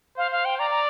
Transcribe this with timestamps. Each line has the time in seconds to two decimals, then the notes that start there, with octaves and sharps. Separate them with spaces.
0.17 C5 F5
0.32 F5
0.45 G5
0.59 D5 A#5
0.71 A#5